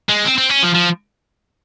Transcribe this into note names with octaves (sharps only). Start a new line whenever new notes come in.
G#3
C4
C4
C#4
F3
F3